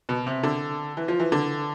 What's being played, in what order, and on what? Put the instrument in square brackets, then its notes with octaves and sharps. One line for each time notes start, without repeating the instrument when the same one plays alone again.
[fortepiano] B2
C3
D3
E3
F3
E3
D3